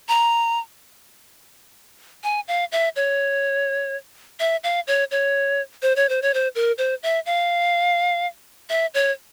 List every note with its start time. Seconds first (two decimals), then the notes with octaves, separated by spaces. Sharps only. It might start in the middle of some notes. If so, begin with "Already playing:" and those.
0.08 A#5
2.24 G#5
2.48 F5
2.72 E5
2.96 C#5
4.40 E5
4.64 F5
4.87 C#5
5.11 C#5
5.82 C5
5.96 C#5
6.09 C5
6.22 C#5
6.34 C5
6.55 A#4
6.78 C5
7.03 E5
7.26 F5
8.70 E5
8.94 C#5